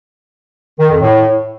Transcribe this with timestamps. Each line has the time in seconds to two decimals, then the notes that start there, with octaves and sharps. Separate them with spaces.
0.79 D#3
0.90 F2
1.00 A2